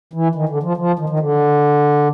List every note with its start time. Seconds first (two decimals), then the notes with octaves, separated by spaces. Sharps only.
0.13 E3
0.35 D#3
0.49 D3
0.63 F3
0.77 F3
0.99 D#3
1.09 D#3
1.19 D3